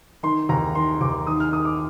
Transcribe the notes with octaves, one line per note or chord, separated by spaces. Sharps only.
D#3 C6
D#2 A#5
D#3 C6
D#2 D6
D#3 D#6
F6
D#3 D#6
D6